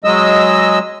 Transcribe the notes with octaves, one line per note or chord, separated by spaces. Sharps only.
F#3 G#3 D#5 E6